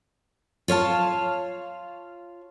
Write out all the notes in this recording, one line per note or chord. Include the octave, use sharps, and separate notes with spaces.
F4 C#5 F5 A5